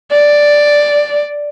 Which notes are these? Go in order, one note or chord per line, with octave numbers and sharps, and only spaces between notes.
D5